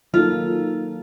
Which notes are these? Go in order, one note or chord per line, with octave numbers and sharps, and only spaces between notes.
D#3 F#3 A#3 D#4 F4 A4